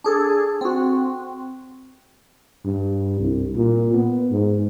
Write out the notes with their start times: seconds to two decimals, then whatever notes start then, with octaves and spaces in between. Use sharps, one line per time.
0.04 D4 G#4 A4
0.61 C4 F#4
2.65 G2
3.20 C2
3.56 A#2
3.94 B3
4.31 G#2